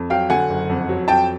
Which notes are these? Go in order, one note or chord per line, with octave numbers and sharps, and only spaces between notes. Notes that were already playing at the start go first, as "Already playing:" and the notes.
Already playing: F2
F#3 F5 G5
D3 F#5 G#5
F#1
F2
F#3
F2 G5 A5